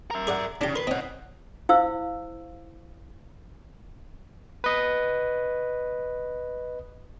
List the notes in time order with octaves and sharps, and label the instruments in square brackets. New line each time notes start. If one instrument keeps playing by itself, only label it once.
[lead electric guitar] A#4 E5
[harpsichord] G#4 D5 F#5
[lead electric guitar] C#3 [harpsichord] D4 G4
[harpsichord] A#4 C6 [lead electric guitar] B4
[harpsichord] C4 C#4 [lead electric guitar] D#5 F#5
[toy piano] E4 C5 F5 E6
[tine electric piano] B4 D#5